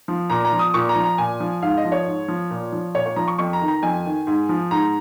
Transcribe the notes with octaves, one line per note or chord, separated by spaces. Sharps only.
F3
A#2 A#5
A#5
F3
D#6
A#2 C#6
A#5
F3
A#5
A#2 G#5
F3
G#2 F5
D#5
F3
C#5
G#2
F3
A#2
F3
A#2 C#5
C#5
F3 A#5
C#6
F2 C#6
A#5
D#3
A#5
F2 G#5
D#3
G#2
F3
G#2 A#5